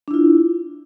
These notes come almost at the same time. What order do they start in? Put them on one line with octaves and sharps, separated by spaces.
D4 E4 F4